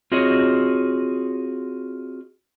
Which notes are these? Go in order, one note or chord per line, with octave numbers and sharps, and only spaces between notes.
C4 F4 F#4 G#4 C#5 D#5